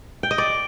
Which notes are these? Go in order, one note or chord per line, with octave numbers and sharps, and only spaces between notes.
G5
D#5
D5